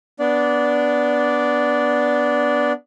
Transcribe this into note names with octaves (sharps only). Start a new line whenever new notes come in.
B3 D4 D5